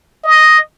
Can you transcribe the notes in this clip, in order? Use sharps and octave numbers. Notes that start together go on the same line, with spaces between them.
D#5